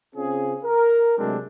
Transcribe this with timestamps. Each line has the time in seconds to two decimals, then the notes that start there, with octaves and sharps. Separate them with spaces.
0.15 C#3 C4 C#4 F4 G#4
0.64 A#4
1.18 C3 F#3 G#3 A3 C4 D4